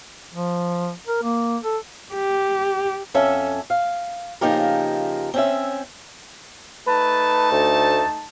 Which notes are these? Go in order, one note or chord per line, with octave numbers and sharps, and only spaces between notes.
F3
A#4
A#3
A4
G4
F2 C#4 A4 E5
F5
C#3 F3 A#3 D#4 G4 A#4
C4 C#4 E5
A3 D#4 B4 A5
D2